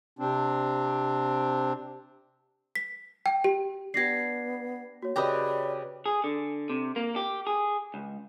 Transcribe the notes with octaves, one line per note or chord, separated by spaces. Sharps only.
C3 C4 D4
B6
G5
G4
B3 D4 G4 G#6 A#6 C7
A#3 F#4 C#5
C#3 G4 B4 C5 D5 D#5 A#5
G#4
D3
C3
A#3
G4
G#4
C#2